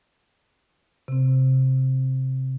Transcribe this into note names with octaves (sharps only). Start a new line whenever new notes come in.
C3 C4